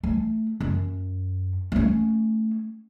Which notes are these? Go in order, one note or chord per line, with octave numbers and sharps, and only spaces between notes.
A3
F#2
A3 C#4